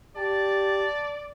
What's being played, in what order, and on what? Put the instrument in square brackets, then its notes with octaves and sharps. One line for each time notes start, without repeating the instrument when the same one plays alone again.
[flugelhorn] G4 [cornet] D5 [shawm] A5